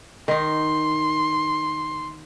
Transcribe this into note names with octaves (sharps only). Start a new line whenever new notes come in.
D#3 D#4 C6